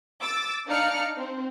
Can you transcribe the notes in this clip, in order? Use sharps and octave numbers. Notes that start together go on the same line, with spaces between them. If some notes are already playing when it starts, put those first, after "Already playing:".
D6 E6 A6
D4 D#4 D5 F5 F6 C#7
C4